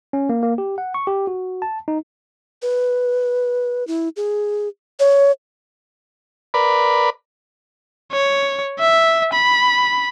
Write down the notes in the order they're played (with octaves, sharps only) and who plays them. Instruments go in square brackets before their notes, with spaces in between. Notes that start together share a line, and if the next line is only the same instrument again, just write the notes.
[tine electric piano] C#4
A#3
A#3
G4
F#5
C#6
G4
F#4
A5
D#4
[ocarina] B4
E4
G#4
C#5
[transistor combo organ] A#4 B4 D5 B5
[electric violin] C#5
E5
B5